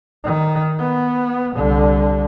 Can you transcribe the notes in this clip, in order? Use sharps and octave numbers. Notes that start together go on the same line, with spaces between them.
D#3
B3
C2 D3